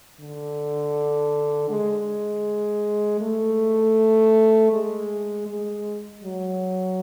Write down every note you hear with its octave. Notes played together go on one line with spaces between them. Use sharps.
D3
G#3
A3
G#3
G#3
F#3